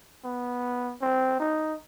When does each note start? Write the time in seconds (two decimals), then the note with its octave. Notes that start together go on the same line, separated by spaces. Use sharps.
0.24 B3
1.02 C4
1.40 D#4